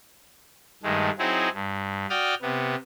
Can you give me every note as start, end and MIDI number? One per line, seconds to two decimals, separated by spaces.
0.83 1.10 43
0.83 1.10 51
0.83 1.10 56
0.83 1.10 57
1.19 1.49 54
1.19 1.49 60
1.19 1.49 63
1.19 1.49 64
1.19 1.49 66
1.19 1.49 68
1.54 2.06 43
2.10 2.34 66
2.10 2.34 74
2.10 2.34 79
2.10 2.34 86
2.10 2.34 87
2.10 2.34 89
2.42 2.76 48
2.42 2.76 59